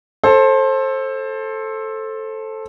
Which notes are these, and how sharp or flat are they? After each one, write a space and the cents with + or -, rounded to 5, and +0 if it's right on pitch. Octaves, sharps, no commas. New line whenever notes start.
A4 +0 C5 +25